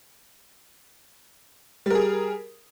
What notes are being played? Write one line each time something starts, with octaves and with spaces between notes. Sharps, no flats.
G3 G#4 A#4